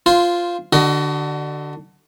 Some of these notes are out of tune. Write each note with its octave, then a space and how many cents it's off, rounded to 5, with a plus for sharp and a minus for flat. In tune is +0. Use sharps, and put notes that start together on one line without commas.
F4 +0 C5 -10 G#5 -10
D3 +15 F#4 +35 D#5 +0